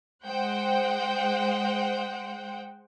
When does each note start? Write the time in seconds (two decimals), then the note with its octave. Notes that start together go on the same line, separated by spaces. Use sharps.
0.24 G#3 C5 F#5 G5